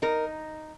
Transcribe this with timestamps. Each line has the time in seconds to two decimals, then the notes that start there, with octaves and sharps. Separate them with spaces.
0.02 D#4 A#4